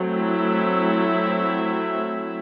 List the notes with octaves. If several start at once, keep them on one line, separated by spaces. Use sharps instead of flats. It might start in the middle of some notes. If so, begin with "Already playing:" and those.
Already playing: F#3 A3 C4
E4 E5